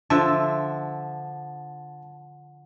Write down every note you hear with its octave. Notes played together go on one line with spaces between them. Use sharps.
D3 F3 E5 A5